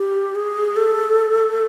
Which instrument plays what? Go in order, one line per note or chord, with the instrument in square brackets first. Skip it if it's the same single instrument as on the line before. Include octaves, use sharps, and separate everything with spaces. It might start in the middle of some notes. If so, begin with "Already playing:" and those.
Already playing: [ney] G4
G#4
A4